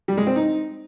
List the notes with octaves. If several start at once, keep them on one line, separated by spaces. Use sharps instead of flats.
G3
G#3
C4
D#4